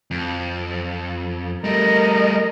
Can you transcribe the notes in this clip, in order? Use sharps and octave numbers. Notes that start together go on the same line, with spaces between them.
F2
G3 A3 A#4 D#5